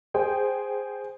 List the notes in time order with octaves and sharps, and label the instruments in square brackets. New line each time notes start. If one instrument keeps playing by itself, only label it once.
[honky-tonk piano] G#4 C5 G5